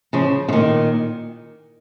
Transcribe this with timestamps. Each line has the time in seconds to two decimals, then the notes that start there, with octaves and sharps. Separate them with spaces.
0.13 C#3 F3
0.48 C#3
0.53 A#2 D#3